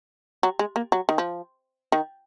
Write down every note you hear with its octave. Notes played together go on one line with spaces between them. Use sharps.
F#3
G#3
A#3
F#3
D#3
F3
D#3